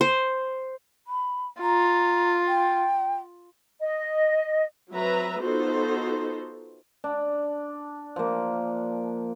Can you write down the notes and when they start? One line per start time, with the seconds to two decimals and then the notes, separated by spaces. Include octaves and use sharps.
0.01 C5
1.07 B5
1.62 F4 A#5
2.47 G5
3.80 D#5
4.91 F#3 C4 B4 E5 A#5
5.43 B3 D#4 F4 F#4 A4 C5
7.04 D4
8.16 F3 A#3